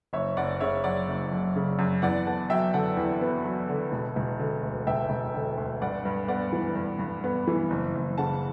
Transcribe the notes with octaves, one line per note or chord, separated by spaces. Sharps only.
F#1 C#5 E5
F#1 D5 F#5
C#3 C#5 E5
F#2 D5 F#5
F#1
F#1
C#3
F#2
E2 D5 F#5
B3 F#5 A5
F#3 E5 G5
D3 F#5 A5
E2
B3
F#3
D3
E1
E1
D3
D2
E1 E5 G5
E1
D3
D2
G2 D5 F#5
G2
B3 D5 F#5
E3
G2
G2
B3
E3
F#1
F#1
C#3 F#5 A5